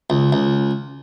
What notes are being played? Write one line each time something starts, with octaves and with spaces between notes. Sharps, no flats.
C#2
C#2